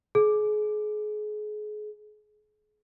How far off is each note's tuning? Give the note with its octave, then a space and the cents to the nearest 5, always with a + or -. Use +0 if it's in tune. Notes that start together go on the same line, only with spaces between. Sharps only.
G#4 +30